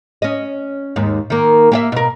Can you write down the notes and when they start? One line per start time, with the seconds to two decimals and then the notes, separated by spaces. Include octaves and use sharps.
0.22 C#4 D#5
0.96 D#2 G#2
1.30 D#3 A#3
1.72 A#3 G4 E5
1.92 B2 A#4